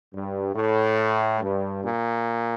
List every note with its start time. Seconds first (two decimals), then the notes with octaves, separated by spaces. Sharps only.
0.13 G2
0.55 A2
1.41 G2
1.83 A#2